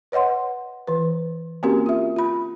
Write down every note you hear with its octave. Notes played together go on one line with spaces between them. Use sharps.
B4 C#5 D#5 F#5 C6
E3 B4
A#3 C4 C#4 F#4 G4 A#4
F4 E5
F4 B5